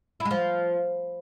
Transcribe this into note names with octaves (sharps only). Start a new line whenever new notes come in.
E4
G#3
F3